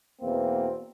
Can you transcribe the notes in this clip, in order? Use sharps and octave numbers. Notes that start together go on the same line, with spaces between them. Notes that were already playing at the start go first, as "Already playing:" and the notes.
E2 B2 A#3 C4